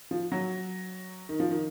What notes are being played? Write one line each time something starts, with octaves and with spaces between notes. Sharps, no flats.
F3
F#3
D#3
F3
D#3